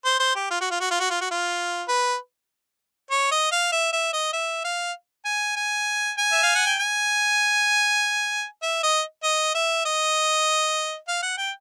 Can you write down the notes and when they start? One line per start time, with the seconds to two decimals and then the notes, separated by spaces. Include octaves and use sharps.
0.05 C5
0.20 C5
0.36 G4
0.51 F4
0.61 F#4
0.71 F4
0.81 F#4
0.91 F4
1.00 F#4
1.11 F4
1.21 F#4
1.31 F4
1.88 B4
3.11 C#5
3.31 D#5
3.52 F5
3.72 E5
3.93 E5
4.13 D#5
4.33 E5
4.65 F5
5.25 G#5
5.56 G#5
6.18 G#5
6.32 E5
6.43 F5
6.55 F#5
6.67 G5
6.79 G#5
8.62 E5
8.83 D#5
9.24 D#5
9.55 E5
9.85 D#5
11.08 F5
11.23 F#5
11.38 G5